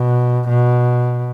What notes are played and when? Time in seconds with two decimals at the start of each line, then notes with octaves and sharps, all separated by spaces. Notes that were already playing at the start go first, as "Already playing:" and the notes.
Already playing: B2
0.49 B2